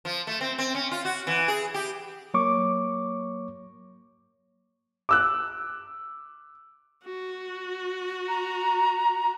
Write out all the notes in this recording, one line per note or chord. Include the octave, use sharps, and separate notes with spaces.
F3
A3
C4
C4
C#4
F4
F#4
E3
G#4
G4
F#3 A#3 C#5 C#6 D6
D6 E6 F#6
F#4
A#5